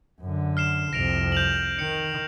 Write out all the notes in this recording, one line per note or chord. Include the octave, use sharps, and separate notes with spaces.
F#2 D3
F6 C7 E7
C2 F2 A#6 D7 F7
G6 F7 F#7
D#3 C#7